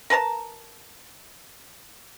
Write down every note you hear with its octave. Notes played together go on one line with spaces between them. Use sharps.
A#4 B4 A5 A#5